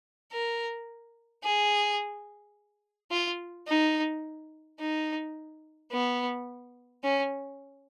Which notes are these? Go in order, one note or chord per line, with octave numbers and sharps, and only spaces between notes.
A#4
G#4
F4
D#4
D#4
B3
C#4